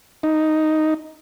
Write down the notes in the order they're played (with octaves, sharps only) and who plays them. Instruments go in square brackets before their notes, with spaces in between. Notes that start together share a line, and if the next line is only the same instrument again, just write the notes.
[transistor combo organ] D#4